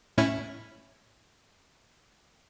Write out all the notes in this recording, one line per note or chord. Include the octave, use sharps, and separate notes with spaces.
A2 C#4 E4